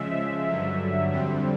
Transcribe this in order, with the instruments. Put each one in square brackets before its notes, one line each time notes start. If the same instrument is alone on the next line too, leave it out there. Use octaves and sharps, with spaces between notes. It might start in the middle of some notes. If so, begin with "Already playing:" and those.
Already playing: [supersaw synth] C#3 F3 G#3 E5
E5
G2 D3 F#3
F2 D3 G3 C4